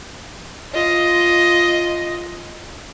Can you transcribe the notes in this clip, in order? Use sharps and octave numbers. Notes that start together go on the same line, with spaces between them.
F4 D#5